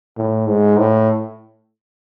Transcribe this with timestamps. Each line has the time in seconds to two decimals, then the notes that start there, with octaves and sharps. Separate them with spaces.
0.18 A2
0.47 G#2
0.78 A2